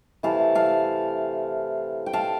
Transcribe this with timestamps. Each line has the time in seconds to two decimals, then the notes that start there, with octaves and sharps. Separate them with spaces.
0.23 C3 E3 A3 F5 A5
0.55 F5 A5
2.06 G5
2.13 F5 A5